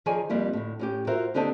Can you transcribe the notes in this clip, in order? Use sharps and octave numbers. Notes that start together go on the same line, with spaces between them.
D#3 F3 G#4 C#5 D5 G#5
F2 G3 A#3 E4
D2 A2
A2 C#4 G4
F4 F#4 A#4 C5 E5
D#2 D3 C4 G4 D#5 A5